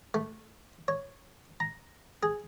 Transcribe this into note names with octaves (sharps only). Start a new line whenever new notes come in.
A3
C#5
A#5
G#4